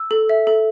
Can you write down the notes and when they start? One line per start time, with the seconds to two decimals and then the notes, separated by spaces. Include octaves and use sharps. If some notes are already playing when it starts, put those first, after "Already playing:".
Already playing: E6
0.11 A4
0.29 E5
0.47 A4